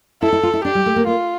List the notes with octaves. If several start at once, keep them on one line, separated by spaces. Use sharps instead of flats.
E4 A4
E4
F4
E4
D4 G4
G3
A3
A#3
A#3 F4